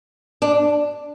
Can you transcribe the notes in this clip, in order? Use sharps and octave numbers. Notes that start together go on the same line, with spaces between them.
D4